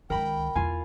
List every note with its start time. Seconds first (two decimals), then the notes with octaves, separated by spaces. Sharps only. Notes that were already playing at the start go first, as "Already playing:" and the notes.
0.10 C#2 D#3 A#4 G5 B5
0.55 E2 E4 F4 G#5